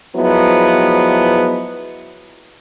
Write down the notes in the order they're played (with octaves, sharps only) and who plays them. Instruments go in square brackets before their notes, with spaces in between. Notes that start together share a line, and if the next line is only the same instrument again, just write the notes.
[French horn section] F3 F#3 G#3 B3 E4